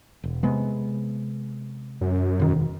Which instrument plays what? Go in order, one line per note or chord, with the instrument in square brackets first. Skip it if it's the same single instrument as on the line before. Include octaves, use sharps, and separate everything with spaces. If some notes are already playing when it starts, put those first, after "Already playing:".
[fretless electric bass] E1
C3 G#3 B3
[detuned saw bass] F#2
[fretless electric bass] E1 D#3